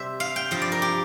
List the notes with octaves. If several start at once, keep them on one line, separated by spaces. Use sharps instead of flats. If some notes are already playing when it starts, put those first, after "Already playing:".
Already playing: C3 G3 C5 E5
F5
G5
G2 F3 F5
D5
A#4
G4